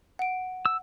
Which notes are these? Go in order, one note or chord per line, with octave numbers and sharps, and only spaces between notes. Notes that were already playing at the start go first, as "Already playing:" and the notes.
F#5 D7
E6